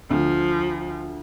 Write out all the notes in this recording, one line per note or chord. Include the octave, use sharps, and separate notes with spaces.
D2 F3